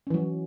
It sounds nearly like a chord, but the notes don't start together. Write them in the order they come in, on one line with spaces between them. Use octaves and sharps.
C#4 E3 F#3